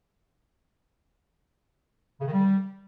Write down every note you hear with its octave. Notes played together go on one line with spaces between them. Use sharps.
C#3
D#3
G3